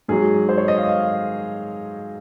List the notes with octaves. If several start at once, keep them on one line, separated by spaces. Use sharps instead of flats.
G#2 F#3 G#4
C5
C#5
D#5
F5
F5